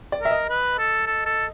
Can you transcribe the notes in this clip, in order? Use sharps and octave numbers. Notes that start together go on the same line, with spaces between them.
D5
A#4 E5
D#5
B4
A4
A4
A4